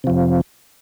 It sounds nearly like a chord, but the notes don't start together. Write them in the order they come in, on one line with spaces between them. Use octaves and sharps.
C3 F3 F2